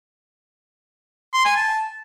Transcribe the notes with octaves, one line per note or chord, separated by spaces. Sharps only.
C6
G#5
A5